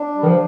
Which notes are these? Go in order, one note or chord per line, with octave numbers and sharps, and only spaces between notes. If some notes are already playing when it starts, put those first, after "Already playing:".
Already playing: D4
G3
D#3
F3